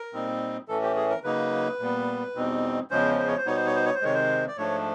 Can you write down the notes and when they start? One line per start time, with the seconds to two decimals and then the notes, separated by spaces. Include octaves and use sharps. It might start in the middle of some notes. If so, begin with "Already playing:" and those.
Already playing: A#4
0.13 A#2 G3 C4 D#4
0.68 A2 E3 A3 C#4 A4
0.82 G4
0.96 G#4
1.10 A#4
1.24 C#3 F#3 A#3 D#4 B4
1.79 A#2 G3 B3
2.35 E2 B2 G3 C4 D#4
2.90 E2 C#3 F3 G#3 C#4 C5
3.18 C5
3.28 C#5
3.38 C5
3.46 B2 G3 B3 D#4 C#5
3.56 C5
3.66 C#5
3.76 C5
3.85 C#5
3.95 C5
4.01 C3 D#3 G#3 C#5
4.14 C5
4.48 D5
4.57 G#2 F3 A3 D4 C#5